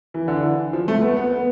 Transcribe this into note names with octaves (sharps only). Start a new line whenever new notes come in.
E3
D3
E3
F3
A3
B3
B3
B3